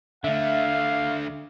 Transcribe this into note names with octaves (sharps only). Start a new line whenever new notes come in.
D3 A3 E5 F5